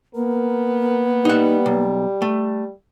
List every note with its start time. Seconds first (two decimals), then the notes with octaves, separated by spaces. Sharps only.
0.15 A#3 B3 A#4
1.25 G3 D#4 F#5
1.66 B1
2.22 A3